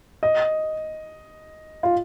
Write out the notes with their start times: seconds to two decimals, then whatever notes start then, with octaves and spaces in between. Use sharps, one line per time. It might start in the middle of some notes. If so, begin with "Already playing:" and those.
0.23 D#5
1.83 F4